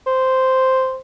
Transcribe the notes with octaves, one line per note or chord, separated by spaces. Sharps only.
C5